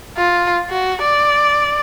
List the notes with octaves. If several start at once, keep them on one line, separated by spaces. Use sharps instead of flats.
F4
F#4
D5